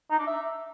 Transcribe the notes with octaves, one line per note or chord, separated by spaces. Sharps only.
D#4
D4
E5